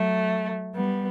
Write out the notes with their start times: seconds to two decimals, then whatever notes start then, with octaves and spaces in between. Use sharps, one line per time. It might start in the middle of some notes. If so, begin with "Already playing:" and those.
Already playing: F#3 A3
0.75 G3 B3